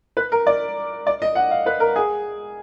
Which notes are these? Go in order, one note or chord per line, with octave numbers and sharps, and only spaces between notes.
B4
A#4
D5
D5
D#5
F#5
F5
B4
A#4
G#4